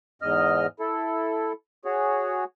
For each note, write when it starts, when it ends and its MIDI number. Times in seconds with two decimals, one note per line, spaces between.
0.22 0.67 40
0.22 0.67 44
0.22 0.67 75
0.22 0.67 89
0.80 1.53 64
0.80 1.53 69
1.85 2.44 66
1.85 2.44 68
1.85 2.44 73